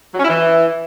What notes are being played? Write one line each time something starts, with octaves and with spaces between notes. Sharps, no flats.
F#3
C#4
E4
E3